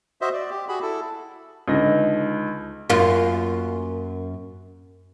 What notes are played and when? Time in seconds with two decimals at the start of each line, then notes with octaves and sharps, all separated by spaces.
0.21 F#4 C5 D#5 E5
0.33 D5
0.51 G4
0.68 F#4 G#4 B5
0.82 E4 A4
1.68 C#2 D3 D#4 A#6
2.90 F#2 A#3 F4